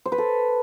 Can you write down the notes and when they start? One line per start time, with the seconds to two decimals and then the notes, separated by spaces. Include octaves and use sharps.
0.05 C5
0.12 B4
0.18 A4